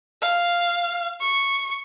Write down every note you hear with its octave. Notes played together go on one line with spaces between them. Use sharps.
F5
C#6